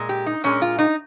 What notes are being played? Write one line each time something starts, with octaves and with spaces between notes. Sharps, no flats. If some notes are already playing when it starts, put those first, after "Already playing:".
Already playing: A#2 G#3
G4
D#4
A#2 G#3 C#4
F4
D#4